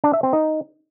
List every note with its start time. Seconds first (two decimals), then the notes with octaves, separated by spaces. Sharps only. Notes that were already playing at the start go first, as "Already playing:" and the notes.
0.04 D4
0.13 E5
0.23 C4
0.33 D#4